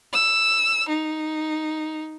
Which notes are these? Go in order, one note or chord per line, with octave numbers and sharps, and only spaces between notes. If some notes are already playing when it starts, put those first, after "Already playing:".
E6
D#4